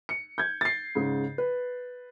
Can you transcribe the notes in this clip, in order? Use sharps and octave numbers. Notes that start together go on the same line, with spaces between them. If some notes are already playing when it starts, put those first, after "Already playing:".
C#7
G6 G#6
A6 C7
G#2 C#3
B4